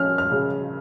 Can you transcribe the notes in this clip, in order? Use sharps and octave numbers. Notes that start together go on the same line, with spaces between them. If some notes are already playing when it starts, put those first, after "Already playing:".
Already playing: F3 C#4 F6
F6
C#3